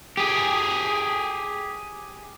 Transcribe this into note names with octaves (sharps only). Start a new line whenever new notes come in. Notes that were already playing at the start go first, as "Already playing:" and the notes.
G4 G#4